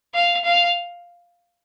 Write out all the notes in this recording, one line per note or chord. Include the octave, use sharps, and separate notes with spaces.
F5
F5